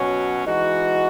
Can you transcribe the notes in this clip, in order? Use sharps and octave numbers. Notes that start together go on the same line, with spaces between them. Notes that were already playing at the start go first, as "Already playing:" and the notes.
Already playing: B2 F#3 C#4
E3 G#3 D#4 F#4